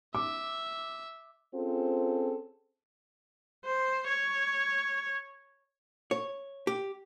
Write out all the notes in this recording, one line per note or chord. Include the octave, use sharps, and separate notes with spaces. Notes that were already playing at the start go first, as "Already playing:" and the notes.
E5 D6
C4 C#4 F4 G#4 A4 C5
C5
C#5
C#5
G4